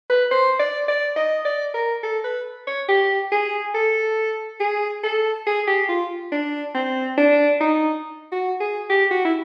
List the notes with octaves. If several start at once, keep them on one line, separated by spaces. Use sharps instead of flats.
B4
C5
D5
D5
D#5
D5
A#4
A4
B4
C#5
G4
G#4
A4
G#4
A4
G#4
G4
F4
D4
C4
D4
D#4
F#4
G#4
G4
F#4
E4